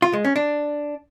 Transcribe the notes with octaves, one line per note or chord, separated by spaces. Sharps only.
F4
G#3
C#4
D4